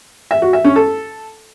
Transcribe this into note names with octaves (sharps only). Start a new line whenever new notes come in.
E5
F#4
E5
C#4
A4